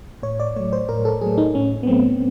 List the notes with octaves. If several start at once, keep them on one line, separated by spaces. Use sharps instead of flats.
A2 C#5
D5
F#3 A3 C#5
C5
A2 A#4
A4
F#3 A3 G#4
D#4
A2 C#4
B3
F#3 A3 C4